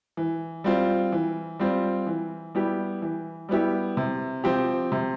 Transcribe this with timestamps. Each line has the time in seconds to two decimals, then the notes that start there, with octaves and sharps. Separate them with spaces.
0.17 E3
0.64 G3 C4 F4
1.12 E3
1.60 G3 C4 F4
2.07 E3
2.55 G3 B3 E4 G4
3.02 E3
3.49 G3 B3 E4 G4
3.97 C3
4.44 F3 C4 G4
4.92 C3